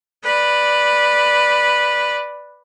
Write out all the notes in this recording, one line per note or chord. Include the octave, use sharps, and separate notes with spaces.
B4 D5